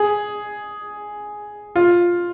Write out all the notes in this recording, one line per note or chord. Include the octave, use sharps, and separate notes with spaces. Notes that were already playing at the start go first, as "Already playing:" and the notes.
Already playing: G#4
F4